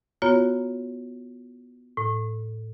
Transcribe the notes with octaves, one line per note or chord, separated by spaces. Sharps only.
B3 F4 F#4 C#5 A#5
A2